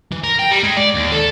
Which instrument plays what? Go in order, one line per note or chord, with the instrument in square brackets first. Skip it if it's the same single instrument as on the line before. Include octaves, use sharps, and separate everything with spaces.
[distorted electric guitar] E3
A#4
G5
G3
G#3
D5
D#2
A4